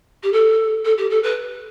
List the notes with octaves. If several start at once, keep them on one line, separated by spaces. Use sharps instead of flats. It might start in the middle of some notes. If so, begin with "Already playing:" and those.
G4
A4
A4
G4
A4
B4